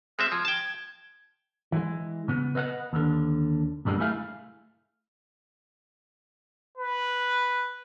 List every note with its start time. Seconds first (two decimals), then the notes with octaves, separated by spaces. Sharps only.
0.19 G#3 C4 E5 F6
0.32 F3 G#6
0.45 G5 A5
1.72 E3 G#3
2.28 C#3 B3
2.55 B4 D#5 F5 F#5
2.93 D#2 D3
3.85 B1 G2 D3 G3 G#3 A#3
4.00 A3 E4 G#4 E5 F5
6.77 B4